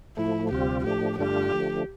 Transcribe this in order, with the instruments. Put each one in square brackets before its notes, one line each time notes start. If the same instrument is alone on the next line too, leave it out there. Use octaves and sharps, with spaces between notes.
[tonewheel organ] A2 F3 A3 [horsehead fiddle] E4
[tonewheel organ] D2 C3 G3 C4 F4 [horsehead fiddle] G4
[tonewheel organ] A2 F3 A3 D4 [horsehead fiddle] G4
[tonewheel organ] G2 D3 A3 D4 F4 [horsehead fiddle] G4
[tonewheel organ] D3 F3 A3